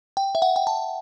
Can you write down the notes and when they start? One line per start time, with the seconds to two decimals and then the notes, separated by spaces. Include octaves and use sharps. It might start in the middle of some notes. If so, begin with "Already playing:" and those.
0.17 G5
0.35 E5
0.42 F#5
0.56 G5
0.67 A5